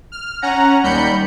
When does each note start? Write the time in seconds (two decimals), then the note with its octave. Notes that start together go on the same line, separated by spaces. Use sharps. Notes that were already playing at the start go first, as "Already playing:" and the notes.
0.12 F6
0.42 C#4 F#5 A#5
0.84 D#2 G3 B5 G6 C#7